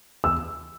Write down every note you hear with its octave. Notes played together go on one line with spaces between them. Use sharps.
E6